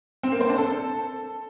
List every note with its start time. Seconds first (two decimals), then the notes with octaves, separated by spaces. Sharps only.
0.23 C4
0.32 A#3
0.41 C5
0.49 D4
0.58 A4